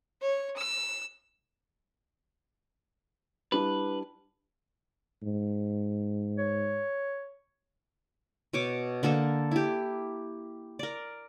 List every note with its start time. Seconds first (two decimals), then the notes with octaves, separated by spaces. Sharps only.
0.22 C#5
0.56 E6
3.52 G3 D4 E4 B4
5.23 G#2
6.38 C#5
8.53 B2 C#5 D6
9.03 D3 A#3 A4 A#4
9.51 E4 G4
10.79 A#4 D5